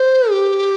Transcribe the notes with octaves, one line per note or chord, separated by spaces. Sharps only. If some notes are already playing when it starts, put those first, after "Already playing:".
Already playing: C5
G4